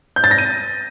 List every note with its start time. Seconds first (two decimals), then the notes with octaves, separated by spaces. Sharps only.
0.16 G6
0.24 A6
0.31 A#6
0.38 D#7